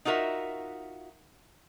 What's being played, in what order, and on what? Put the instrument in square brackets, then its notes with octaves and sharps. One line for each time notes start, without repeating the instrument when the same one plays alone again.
[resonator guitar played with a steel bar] D#4 F4 F#4 A#4 E5